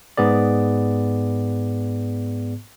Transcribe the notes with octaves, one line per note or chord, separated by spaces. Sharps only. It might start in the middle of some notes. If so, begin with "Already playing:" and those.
G#2 B3 G#4 D5